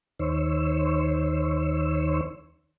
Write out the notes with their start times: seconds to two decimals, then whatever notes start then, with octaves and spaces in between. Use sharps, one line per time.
0.19 D#2 D#3 C5 C#5 E6